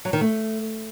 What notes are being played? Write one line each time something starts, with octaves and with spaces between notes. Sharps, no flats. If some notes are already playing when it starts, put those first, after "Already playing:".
F#3
D#3
A3